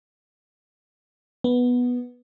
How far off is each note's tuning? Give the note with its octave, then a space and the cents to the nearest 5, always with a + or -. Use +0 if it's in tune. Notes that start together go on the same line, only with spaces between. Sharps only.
B3 -5